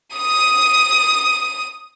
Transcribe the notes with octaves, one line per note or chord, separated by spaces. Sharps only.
D#6 D#7